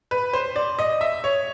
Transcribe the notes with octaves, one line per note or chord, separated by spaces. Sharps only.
B4
C5
D5
D#5
E5
C#5